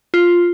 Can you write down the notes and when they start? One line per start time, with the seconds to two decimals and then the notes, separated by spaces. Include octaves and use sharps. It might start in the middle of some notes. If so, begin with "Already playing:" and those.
0.14 F4